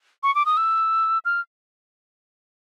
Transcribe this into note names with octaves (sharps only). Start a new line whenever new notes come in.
C#6
D6
D#6
E6
F6